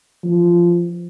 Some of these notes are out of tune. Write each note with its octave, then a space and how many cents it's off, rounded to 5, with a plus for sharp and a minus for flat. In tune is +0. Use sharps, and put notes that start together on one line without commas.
F3 -10